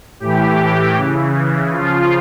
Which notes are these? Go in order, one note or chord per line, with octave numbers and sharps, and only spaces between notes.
A2 E3 G4
C#3 E3
C#3 F3 F4